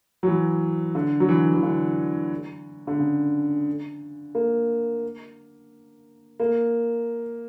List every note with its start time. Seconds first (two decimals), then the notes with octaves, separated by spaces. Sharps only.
0.23 F#3
0.27 E3
0.95 D3
1.20 F#3
1.29 E3
1.54 E3
1.63 D3
2.87 D3
2.99 C#3
4.35 A#3
6.40 A#3